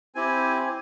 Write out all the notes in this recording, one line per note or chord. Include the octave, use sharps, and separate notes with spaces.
C4 E4 G4 G#5
G#5